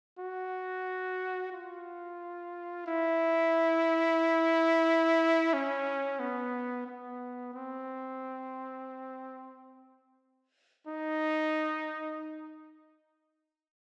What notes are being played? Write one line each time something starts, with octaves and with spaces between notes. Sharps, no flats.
F#4
F4
E4
C#4
B3
B3
C4
D#4